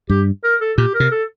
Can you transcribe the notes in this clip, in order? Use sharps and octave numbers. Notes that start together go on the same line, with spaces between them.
G2 G4
A#4
A4
A#2 G4
A#4
C3
A4